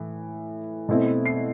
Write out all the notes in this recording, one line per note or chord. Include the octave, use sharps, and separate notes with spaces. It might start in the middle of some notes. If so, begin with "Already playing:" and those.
Already playing: A2 E3
B2 A3 C4 E4
C7